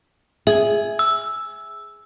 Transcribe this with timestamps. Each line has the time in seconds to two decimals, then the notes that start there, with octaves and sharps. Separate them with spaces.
0.47 G#4 E5
0.99 E6